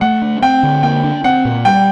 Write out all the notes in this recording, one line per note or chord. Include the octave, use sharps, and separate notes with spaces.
A3 F#5
D4
C4 G5
D3
A#3 G5
D4
C4 F#5
A#2
G3 G5